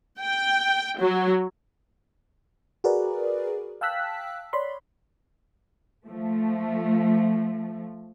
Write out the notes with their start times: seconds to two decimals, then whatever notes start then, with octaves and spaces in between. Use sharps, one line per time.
0.19 G5
1.00 F#3
2.84 F#4 G#4 A#4 B4 D5
3.81 F5 G5 A5 E6 F#6 B6
4.53 C#5 D5 B5 C6
6.08 F3 A3